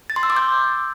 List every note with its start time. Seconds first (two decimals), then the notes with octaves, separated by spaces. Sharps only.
0.10 A6
0.16 C6
0.23 E6
0.30 D6
0.37 G6